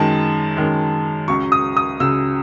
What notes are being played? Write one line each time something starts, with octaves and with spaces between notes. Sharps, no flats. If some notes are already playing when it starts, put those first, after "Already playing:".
Already playing: F#2 D#3 G#3 A5
F#2 D#3 G#3
C#2 C#3 F#3 C#6
D#6
D#6
C#2 C#3 F#3 E6